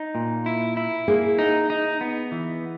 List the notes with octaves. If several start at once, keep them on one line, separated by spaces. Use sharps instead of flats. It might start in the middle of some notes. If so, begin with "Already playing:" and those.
Already playing: D#4
A#2
E4
E4
A#3 G#4
D#4
D#4
B3
E3